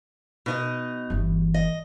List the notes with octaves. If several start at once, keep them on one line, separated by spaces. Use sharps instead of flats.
B2 D#4 D#5
G1 E3
D#5